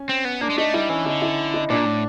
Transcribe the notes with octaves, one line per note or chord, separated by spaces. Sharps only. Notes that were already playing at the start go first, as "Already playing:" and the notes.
Already playing: C#4
C4
B3
A#3 D4
G#3
A3 D#4
G3 E4
E3 C#4
D3 D#4
E4
D#4
A#2 D4
A2